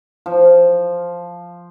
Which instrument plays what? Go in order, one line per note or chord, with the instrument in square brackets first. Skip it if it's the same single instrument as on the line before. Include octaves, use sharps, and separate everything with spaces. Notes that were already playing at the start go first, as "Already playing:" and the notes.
[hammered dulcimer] F3